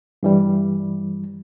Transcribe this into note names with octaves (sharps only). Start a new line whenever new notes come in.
G2 E3 G3